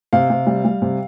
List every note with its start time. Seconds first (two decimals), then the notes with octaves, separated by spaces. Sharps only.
0.13 C3 F5
0.30 C3
0.46 G3
0.64 G3
0.82 C3